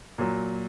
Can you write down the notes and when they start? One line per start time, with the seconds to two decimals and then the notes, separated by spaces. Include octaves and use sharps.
0.18 A#2 F#3